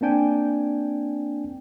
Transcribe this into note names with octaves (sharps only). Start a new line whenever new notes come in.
A#3 C4 D4 G5 G#5